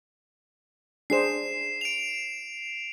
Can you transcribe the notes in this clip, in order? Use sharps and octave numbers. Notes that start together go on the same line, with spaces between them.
D4 G#4 C5 C7 E7
D7 F7